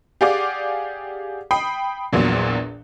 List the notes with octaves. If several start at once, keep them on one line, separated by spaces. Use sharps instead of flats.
G4 G#4 D5 F5 F#5 D6
G5 B5 D#6 C7
A#1 E2 A#2 F#3